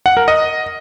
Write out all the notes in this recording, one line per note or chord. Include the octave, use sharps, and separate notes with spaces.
F#5
A#4
D#5